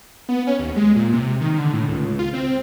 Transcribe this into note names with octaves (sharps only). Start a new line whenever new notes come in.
B3
C#4
D#2
G#3
A#2
C3
D#3
D3
A2
C#2
F4
C4